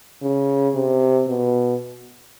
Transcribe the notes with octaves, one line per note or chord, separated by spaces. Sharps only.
C#3
C3
B2